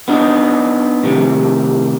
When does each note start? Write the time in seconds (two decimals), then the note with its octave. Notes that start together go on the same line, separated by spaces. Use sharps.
0.08 B3 D4 D#4
1.03 A2 C3 D#3